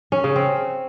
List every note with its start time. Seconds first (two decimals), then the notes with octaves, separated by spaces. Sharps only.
0.12 C#4
0.24 C#3
0.36 C4